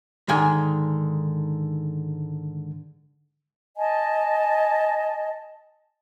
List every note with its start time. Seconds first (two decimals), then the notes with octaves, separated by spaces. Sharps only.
0.29 G#2 D3 D#3 G#5
3.77 D#5 G#5 A5